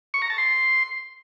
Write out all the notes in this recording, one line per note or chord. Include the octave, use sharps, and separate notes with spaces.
C#6
A#5
A5
C6